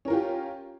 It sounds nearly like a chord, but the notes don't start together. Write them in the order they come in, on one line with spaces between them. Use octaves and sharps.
C#4 A#4 F4 G4